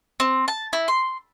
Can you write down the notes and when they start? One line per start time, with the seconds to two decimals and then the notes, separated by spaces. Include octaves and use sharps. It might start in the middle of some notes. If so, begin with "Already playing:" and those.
0.20 C4
0.48 A5
0.73 E4
0.88 C6